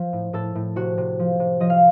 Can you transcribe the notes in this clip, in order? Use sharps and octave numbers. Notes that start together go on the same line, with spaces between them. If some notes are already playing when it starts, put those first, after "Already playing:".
Already playing: F3
A2
A2 A4
A2
C3 F#4
C3
F3
C3
F3 D#5
F5